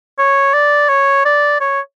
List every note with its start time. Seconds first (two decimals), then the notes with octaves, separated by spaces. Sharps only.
0.18 C#5
0.54 D5
0.89 C#5
1.25 D5
1.61 C#5